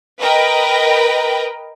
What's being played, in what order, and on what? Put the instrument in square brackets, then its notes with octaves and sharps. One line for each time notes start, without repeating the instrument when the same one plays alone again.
[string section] A#4 B4 D#5 G5 A#5